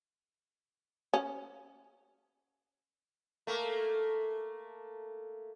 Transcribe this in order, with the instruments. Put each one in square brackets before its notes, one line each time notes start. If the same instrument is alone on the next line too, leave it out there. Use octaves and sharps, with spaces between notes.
[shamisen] C#4
[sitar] A3 A#3